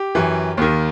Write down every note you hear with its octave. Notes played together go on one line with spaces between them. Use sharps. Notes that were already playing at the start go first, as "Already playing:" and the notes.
Already playing: G4
F#2 E3
D#2 D#3